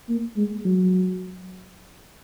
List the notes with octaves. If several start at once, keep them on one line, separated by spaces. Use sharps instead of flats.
A#3
G#3
F#3